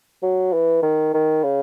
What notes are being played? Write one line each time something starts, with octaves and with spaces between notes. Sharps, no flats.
F#3
E3
D#3
D#3
C#3